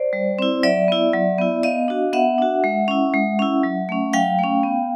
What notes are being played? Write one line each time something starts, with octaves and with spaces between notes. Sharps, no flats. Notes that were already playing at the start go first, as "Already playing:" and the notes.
Already playing: C5 D5
G3
C4 E4
F#3 D5 E5
B3 E4
F#3
B3 E4
B3 D#5 F5
D4 F#4
B3 E5 F#5
D4 F#4
G#3
C#4 E4
G#3
C#4 E4
F#3
A3 C#4
F#3 F5 G5
A3 C#4
B3